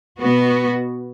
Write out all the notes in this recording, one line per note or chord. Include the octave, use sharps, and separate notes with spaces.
B2 B3 F#4